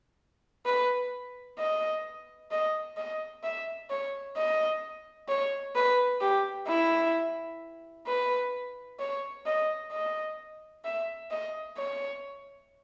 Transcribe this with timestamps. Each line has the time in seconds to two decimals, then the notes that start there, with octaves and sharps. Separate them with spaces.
0.66 B4
1.58 D#5
2.51 D#5
2.97 D#5
3.43 E5
3.90 C#5
4.36 D#5
5.28 C#5
5.75 B4
6.21 G4
6.68 E4
8.07 B4
9.00 C#5
9.46 D#5
9.92 D#5
10.85 E5
11.31 D#5
11.77 C#5